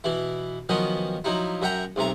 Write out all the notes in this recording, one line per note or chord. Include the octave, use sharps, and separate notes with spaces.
B2 E3 E4
D#3 F3 F#3 B3 C#4 D#5
F3 F#3 D#4 E4
F#2 E5 F#5 G5 A#5
B1 C3 A3 A#5